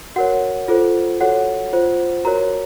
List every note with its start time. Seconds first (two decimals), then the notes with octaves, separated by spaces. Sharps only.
0.16 F#4 A#4 C#5 F#5
0.68 F4 A4 C5
1.21 F#4 A4 C#5 F#5
1.72 F4 C5
2.25 F#4 A#4 C#5 A#5